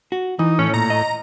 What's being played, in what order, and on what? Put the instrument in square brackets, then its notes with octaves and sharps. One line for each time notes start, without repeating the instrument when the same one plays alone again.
[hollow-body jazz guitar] F#4
[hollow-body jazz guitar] E3 [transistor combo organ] D#4
[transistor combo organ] A2 [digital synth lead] C#4
[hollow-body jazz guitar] A#2 [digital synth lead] A#5
[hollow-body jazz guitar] D#5